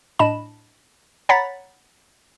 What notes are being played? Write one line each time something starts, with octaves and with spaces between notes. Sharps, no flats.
A2 D4 D#5 A5 B5 E7
C#5 F#5 A#5 B5 A6 B6